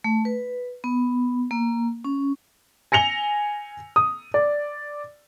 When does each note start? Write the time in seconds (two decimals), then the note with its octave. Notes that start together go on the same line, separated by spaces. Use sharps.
0.04 A3
0.25 B4
0.84 B3
1.51 A#3
2.04 C#4
2.92 G#5 A#6 C#7 F7 G7
3.96 D#6
4.34 D5